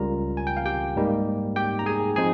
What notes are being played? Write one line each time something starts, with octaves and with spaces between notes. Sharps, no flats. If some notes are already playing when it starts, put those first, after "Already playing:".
Already playing: C#2 C#3 G3 C#4 F4 A#4 A#5
G#5
G5
F5
G4 G5
G#2 G3 A#3 D#4
G4 G5
A#5
G#4 G#5
F3 C4 D#4 G#4 G#5